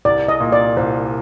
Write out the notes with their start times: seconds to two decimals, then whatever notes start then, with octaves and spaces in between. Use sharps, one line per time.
0.05 C2 D5
0.28 D#5
0.40 A#2
0.52 D5
0.77 C2 C5